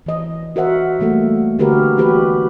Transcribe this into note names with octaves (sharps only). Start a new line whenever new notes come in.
E3 D#5
F#4 A#4 C5 E5 F#5
E3 G3 A3 A#3 A4
D3 F#4 G4 A#4 B4
E3 D#4 F#4 G4 B4